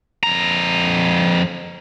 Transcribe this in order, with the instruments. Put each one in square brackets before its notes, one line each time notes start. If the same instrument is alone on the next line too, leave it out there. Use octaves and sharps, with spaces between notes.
[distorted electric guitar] F2 A#5